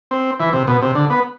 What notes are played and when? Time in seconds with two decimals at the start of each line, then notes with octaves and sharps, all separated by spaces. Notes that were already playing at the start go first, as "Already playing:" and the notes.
0.11 C4
0.40 E3
0.53 C3
0.67 B2
0.82 C3
0.95 D3
1.10 B3